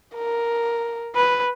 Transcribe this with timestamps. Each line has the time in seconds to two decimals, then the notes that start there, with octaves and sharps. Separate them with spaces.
0.16 A#4
1.15 B4